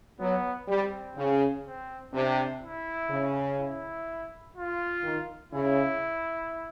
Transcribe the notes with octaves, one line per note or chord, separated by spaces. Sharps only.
F#3 B3
G3 C4
C#3
C4
C3 D4
E4
C#3
E4
F4
D#3
C#3 E4